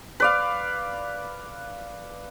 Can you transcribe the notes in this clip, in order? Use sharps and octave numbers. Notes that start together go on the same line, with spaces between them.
B4 D5 F5